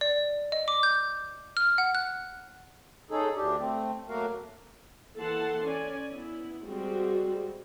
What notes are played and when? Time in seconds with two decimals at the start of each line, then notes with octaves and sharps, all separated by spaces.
0.01 D5
0.52 D#5
0.68 D6
0.83 G6
1.57 F6
1.78 F#5
1.95 F#6
3.11 C#4 D#4 G#4 A4
3.36 D2 D4 G4
3.59 A3 C4
4.09 F#3 A3 A#3 F#4 A#4 F5
5.18 E3 A#3 A4 F#5 A5 C6
5.64 C#4 D5 G#5
6.13 B3 E4
6.65 G3 G#3 C4 F#4